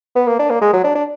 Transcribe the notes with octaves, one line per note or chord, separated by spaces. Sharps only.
B3
A#3
D4
A#3
G#3
F#3
D4
D4